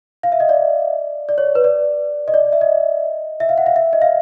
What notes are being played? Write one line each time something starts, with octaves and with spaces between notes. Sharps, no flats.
F5
E5
D#5
D5
D5
C#5
B4
D5
D#5
D5
E5
D#5
E5
F5
F#5
F5
E5
D#5
F5